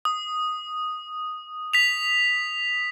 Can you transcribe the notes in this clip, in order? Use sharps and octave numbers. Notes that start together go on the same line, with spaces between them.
D#6
B6 F7